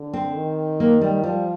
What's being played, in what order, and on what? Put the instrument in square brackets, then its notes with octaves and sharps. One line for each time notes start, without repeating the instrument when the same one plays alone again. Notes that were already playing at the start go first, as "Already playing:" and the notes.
Already playing: [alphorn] D3
[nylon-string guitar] C4
[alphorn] D#3
[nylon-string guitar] A#3
G3
[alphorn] F3 [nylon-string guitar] G3